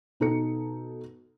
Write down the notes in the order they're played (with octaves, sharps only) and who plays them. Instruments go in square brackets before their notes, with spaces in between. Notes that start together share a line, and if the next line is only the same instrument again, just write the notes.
[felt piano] B2 D#4 A4 C#7